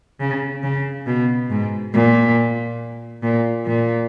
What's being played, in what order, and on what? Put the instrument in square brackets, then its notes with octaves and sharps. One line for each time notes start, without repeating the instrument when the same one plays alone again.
[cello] C#3
C#3
B2
G#2
A#2
A#2
A#2